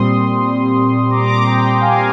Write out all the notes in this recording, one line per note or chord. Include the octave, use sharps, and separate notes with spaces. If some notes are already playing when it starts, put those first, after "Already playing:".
Already playing: A#2 G3 C4 C6 D#6
A#5 D6
A#5 D6
G5 A#5
F5 G#5